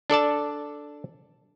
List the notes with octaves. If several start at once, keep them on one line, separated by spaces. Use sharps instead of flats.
D4 A4 D5 A5